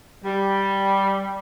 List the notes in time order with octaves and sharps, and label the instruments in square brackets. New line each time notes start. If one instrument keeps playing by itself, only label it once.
[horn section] G3